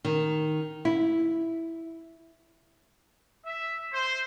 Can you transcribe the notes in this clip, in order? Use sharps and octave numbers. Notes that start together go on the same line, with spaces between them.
D#3
E4
E5
C5